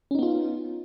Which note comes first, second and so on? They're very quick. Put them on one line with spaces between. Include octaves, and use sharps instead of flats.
C#4 D#4 B3 F4